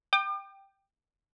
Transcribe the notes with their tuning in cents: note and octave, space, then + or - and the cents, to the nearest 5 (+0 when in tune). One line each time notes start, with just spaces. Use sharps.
G5 +0 D6 +40